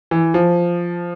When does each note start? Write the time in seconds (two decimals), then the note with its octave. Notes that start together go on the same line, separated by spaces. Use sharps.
0.11 E3
0.34 F3